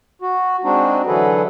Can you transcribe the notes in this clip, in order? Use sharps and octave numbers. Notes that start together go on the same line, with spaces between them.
F#4
G#3 C4 D4 D#4 F#4
D3 E3 F#3 G#4 A4 B4